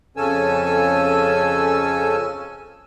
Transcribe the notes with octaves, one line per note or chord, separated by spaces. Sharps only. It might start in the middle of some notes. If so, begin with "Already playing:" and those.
F2 C#3 C#4 A4 G#5 E6